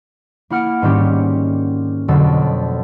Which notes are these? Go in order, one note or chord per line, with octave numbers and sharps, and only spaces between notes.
A#3 E4 F#5 F6 C#7 D7
G#2 D#3 G3 C4 C#4 G4
F2 B2 D3 F#3 A5 E6